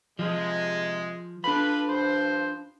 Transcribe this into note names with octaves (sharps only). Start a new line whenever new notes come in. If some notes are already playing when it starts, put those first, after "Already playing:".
C3 F3 G#3
D4 F4 A4 B4 B5
G2 F3 C5